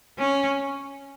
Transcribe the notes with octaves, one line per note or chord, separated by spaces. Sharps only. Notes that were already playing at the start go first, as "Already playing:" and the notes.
C#4